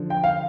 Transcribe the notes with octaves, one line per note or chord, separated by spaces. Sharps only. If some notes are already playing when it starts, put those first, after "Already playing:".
Already playing: D3 F3
G5
F5